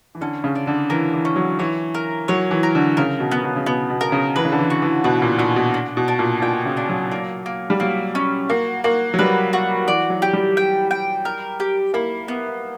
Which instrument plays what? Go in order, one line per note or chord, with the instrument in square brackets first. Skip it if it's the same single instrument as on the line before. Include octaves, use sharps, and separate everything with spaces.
[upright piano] E3
[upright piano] D3 [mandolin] C#4
[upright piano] C#3
[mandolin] D5
[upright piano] D3
[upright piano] E3 [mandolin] A#4
[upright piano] E3
[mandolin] C#4
[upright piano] F#3
[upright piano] E3 [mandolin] C#5
[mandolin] A#4
[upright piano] F#3 [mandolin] C#5
[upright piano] E3
[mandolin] A#4
[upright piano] D3
[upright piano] C#3 [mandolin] A#4
[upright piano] B2
[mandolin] B3
[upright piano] B2
C#3
[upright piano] B2 [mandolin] B3
[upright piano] B2
[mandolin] A#4
[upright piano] C#3
[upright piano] E3 [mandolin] B4
[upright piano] C#3
D3
E3
[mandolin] F#4
[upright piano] E3
[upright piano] B2 [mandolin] B4
[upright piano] A#2
[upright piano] A#2 [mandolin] F#4
[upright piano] B2
[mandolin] D4
[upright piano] B2
[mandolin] D4
[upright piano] A#2
[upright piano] A#2 [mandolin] G5
[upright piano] C#3
[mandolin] D4
[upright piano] F#3
[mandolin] A#3
A#3
[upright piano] G3
[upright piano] F#3 [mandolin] A#3
[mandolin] C#4
[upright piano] A#3 [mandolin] F#4
[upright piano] A#3 [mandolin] F#4
[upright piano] F#3
[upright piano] G3 [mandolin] B4
[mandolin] F#4
[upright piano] E3 [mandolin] D5
[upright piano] F#3
[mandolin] G4
[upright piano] G3
[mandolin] G5
G5
A#4
G4
[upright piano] A#3 [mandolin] E4
[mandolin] B3